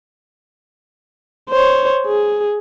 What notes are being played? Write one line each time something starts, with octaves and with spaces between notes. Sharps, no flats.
C5 C#5
G#4